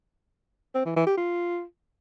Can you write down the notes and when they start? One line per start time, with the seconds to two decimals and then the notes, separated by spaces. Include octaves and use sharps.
0.75 C4
0.85 E3
0.96 E3
1.07 G4
1.17 F4